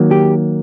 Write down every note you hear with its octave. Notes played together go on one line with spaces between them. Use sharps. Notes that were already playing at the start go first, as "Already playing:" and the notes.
Already playing: D#3 F#3 A#3
G4